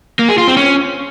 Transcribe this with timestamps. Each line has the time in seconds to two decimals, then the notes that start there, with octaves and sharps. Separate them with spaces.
0.19 A#3
0.29 G#4
0.38 F4
0.47 C4
0.57 C#4